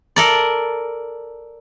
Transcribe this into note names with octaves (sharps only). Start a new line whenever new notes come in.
A4 A#4 D5